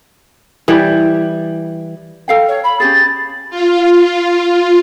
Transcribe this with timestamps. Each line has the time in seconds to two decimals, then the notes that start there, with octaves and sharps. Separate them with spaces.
0.68 E3 G3
2.28 A4 F5 G5
2.48 C#5
2.64 B5
2.80 C#4 G4 G#4 A6
3.50 F4